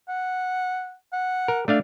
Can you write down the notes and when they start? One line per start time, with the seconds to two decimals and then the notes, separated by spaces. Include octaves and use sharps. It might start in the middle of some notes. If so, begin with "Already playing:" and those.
0.09 F#5
1.13 F#5
1.48 A#4
1.68 A3 D4 D5 F5